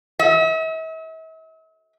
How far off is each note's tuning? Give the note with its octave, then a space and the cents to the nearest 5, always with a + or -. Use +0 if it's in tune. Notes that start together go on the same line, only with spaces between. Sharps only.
E5 -45